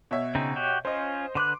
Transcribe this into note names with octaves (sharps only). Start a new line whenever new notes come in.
B2 C#5 E5
C#3 C4 D#4
F#4 G4
C#4 F4 C5 D#5
D3 B4 C6 D6 F#6